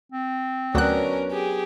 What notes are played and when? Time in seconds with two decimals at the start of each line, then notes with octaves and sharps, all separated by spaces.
0.12 C4
0.75 D2 F#3 B3 C#4 D4 A#4 F#6
1.31 G4 G#4